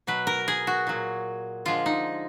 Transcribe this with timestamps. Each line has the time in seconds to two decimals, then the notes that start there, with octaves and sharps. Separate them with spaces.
0.07 B2 F#3 B4
0.27 A#4
0.48 G#4
0.67 F#4
0.87 A#2 F#3
1.65 D3 F3 G#3 F4
1.86 D#4